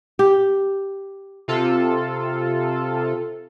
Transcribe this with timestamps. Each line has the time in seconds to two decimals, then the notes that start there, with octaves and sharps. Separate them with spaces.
0.19 G4
1.48 C3 F4 A4